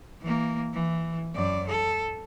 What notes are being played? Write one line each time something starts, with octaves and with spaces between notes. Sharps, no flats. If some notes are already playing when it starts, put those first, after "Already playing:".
E3 A#3
E3
F#2 D5
A4